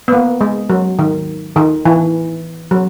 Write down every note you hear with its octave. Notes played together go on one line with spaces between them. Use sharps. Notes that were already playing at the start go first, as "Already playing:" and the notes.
B3
A#3
G#3
F#3
D#3
D#3
E3
F#3